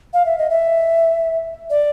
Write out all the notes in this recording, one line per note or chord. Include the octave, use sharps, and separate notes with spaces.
F5
E5
D#5
E5
D5